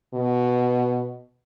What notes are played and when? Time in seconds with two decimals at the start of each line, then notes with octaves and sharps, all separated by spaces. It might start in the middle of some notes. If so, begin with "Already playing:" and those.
0.14 B2